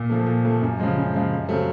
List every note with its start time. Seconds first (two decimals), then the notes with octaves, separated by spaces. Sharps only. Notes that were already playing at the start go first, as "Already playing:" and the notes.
Already playing: A#2
0.10 F3 A3
0.26 A#2
0.44 F3 A3
0.62 F#2
0.79 C#3 F3 G#3
0.97 F#2
1.14 C#3 F3 G#3
1.31 F#2
1.48 C#3 F#3 A3 C4